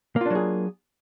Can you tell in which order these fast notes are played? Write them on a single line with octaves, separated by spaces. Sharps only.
A#3 F4 D4 F#3 G#4